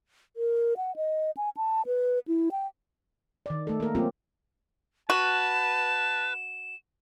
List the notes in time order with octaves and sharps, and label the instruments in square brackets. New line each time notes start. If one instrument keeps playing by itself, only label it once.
[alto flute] A#4
F#5
D#5
G#5
A5
B4
E4
G5
[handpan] D#3 D5
A3 A4
A#3 A#4
F#3 A#3 C4 C#4 F4 G4
[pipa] F#4 [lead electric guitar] B4 [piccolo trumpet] A5 [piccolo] E7